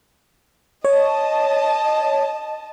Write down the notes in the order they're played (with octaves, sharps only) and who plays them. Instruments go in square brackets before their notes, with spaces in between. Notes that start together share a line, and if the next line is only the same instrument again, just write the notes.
[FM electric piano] C#5 [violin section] D#5 A5